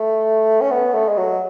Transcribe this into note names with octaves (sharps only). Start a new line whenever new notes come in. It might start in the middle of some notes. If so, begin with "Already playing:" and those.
Already playing: A3
C#4
B3
A3
G#3
F#3